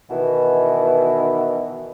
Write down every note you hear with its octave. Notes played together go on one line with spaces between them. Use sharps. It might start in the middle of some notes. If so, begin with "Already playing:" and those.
B2 D#3 E3